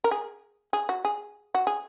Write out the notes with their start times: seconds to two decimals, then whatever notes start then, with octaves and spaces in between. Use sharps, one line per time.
0.04 A#4
0.11 G#4
0.73 G#4
0.89 F#4
1.05 G#4
1.55 F#4
1.67 G#4